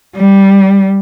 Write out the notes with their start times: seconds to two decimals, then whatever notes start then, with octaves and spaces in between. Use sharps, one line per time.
0.16 G3